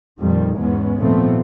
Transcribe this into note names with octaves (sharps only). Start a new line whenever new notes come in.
F2 A#2 D#3 G3
E2 G#2 G#3 B3 C#4
D#2 A#2 F3 A3 B3 C4